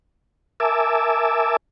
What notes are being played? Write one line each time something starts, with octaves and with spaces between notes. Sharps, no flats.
A#4 E5 G#5 A5 D6 E6